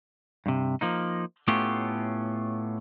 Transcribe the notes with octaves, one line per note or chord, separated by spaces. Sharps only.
G2 C3
F3 A#3 D#4
A2 A3 B3 C#4 F4 G4